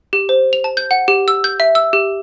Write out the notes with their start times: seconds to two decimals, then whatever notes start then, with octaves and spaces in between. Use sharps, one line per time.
0.13 G4
0.29 C5
0.53 F7
0.64 A5
0.77 G6
0.91 F#5
1.08 G4
1.28 E6
1.44 G6
1.60 E5
1.75 E6
1.93 G4